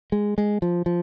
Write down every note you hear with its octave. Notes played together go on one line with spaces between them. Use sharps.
G#3
G#3
F3
F3